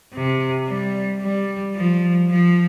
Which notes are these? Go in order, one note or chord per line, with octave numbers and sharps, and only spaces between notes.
C3
G3
G3
F3
F3